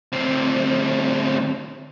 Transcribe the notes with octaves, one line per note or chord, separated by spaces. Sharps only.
D2 C4